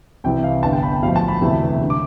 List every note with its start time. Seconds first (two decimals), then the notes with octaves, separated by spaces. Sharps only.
0.24 C2 C3 E3 G3 G5
0.44 F5
0.63 G1 G2 D3 A5
0.73 G5
0.83 B5
0.92 G5
1.02 B1 A2 F3 A3 F5
1.16 A5
1.28 B5
1.41 E1 D2 C3 E3 A3
1.81 D3 A3
1.90 D6